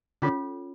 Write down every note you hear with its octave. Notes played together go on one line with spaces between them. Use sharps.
D3 C#4 F4 A4 C#5